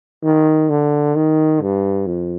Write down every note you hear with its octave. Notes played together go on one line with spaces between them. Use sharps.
D#3
D3
D#3
G2
F2